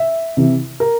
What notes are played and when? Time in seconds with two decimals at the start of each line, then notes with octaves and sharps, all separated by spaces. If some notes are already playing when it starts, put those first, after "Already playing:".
Already playing: E5
0.37 C3 E3
0.80 A#4